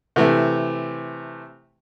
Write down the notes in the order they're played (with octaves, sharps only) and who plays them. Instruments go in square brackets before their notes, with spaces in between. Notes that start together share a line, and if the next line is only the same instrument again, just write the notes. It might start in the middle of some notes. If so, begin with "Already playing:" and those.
[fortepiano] C3 E3 A3